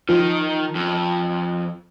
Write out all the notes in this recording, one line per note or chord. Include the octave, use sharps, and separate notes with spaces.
D#3 F3
F2